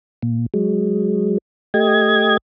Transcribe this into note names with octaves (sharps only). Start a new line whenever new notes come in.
A#2
F#3 G#3
A3 G4 D#5 G#6